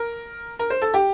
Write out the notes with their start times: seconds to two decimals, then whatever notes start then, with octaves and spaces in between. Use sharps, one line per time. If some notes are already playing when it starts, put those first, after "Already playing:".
Already playing: A#4
0.59 A#4
0.70 C5
0.82 A4
0.94 G4